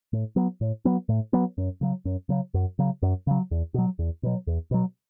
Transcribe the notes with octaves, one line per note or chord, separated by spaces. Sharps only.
A2
F#3 B3
A2
F#3 B3
A2
F#3 B3
F#2
C#3 F#3
F#2
C#3 F#3
F#2
C#3 F#3
F#2
C#3 F#3
E2
B2 F#3
E2
B2 F#3
E2
B2 F#3